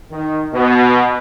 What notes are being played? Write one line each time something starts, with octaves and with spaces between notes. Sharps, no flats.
D#3
B2